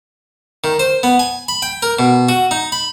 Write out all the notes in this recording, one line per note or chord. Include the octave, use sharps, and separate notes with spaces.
D#3
C5
B3
G#5
B5
G5
A#4
B2
F#4
D#4
B5